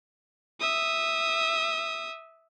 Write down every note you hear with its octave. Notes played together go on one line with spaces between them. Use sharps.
E5 D#6